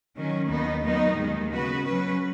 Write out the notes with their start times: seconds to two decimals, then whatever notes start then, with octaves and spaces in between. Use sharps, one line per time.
0.15 D#3 F#3 C#4
0.48 D#2 D#3 B3 D#4
0.82 D#3 F#3 B3 D#4
1.16 D#2 D#3 G#3
1.50 C#3 B3 F#4 B4
1.84 F#3 C#4 B4